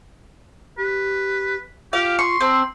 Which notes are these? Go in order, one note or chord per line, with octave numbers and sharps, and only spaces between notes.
G4 B4
F4 G4 F5
C6 C#6
C4 A5